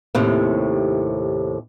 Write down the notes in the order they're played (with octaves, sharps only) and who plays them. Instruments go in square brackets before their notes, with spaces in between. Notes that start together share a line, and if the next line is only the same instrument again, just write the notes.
[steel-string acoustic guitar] D#2 A2 C3